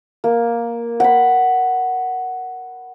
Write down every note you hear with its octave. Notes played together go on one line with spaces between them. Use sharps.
A#3
F#5 B5